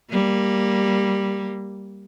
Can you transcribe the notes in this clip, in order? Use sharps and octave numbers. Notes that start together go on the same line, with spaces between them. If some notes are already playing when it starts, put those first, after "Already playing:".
G3 A#3